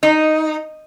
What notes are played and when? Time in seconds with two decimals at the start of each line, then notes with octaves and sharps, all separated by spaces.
0.03 D#4